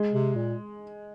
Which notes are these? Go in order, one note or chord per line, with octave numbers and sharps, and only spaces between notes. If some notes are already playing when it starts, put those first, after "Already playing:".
Already playing: G#3
C3
A#2